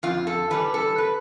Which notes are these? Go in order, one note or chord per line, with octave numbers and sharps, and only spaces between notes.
F2 F4
A4
E3 G3 B4
A4
B4